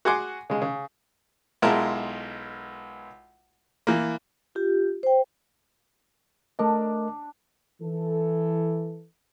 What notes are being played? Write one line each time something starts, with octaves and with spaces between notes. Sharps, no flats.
F#4 G#4 F#5 G#5 C6 D6
C#3 G#3
C#3
B1 G#3 E4 F4 A#4 A5
E3 A#3
F4 G4
C5 G5
A3 D4 A#4 D#5
E3 A4